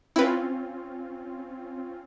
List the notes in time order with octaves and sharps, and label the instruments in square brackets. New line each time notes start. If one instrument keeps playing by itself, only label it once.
[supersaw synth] C4 C#4 F4 [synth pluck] E4 B4